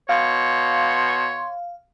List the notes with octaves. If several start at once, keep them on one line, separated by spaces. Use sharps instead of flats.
B2 C#5 F5 C6